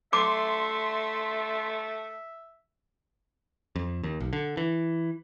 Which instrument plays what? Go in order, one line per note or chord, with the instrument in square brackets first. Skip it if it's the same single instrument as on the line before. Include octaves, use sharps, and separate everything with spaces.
[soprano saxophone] A3 [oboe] E5 [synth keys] C6 [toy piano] D6
[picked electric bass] F2
D#2
B1
D3
E3